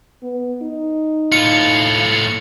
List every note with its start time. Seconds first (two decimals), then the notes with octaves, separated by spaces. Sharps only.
0.23 B3
0.62 D#4
1.32 A2 F4 C#7